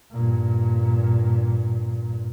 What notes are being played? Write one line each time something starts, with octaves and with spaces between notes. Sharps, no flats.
G2 A#2